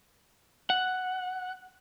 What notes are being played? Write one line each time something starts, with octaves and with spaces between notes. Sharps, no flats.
F#5